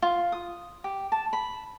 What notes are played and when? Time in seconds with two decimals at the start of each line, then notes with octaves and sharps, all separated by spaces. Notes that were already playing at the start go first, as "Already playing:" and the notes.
0.02 F4
0.32 D#6
0.84 G4
1.12 A5
1.33 B5